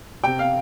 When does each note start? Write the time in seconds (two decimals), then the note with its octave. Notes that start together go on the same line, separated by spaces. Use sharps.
0.23 C3 G5
0.39 F5